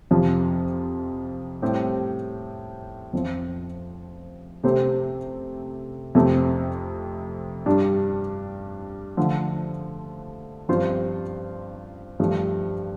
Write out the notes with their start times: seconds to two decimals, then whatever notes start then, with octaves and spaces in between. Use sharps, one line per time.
0.11 F2 C3 F3
1.62 A2 G3 C4 G4
3.13 F2 F3 C4
4.64 C3 A3 C4 G4 C5
6.15 F2 C3 A3 C4
7.66 G2 G3 D4
9.17 D3 F3 A3
10.69 G2 F3 C4 F4 C5
12.20 G2 F3 A3